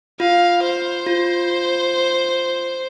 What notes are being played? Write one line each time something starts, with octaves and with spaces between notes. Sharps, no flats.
F4 F5
C5
F4